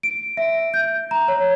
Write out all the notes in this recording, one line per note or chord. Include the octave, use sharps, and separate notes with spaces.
D7
E5
G6
A#5
C#5